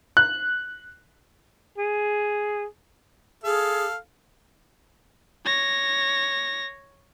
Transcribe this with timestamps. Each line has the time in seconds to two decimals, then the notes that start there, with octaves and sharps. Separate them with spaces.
0.17 F#6
1.78 G#4
3.44 G#4 A4 F5
5.45 C#5 A#6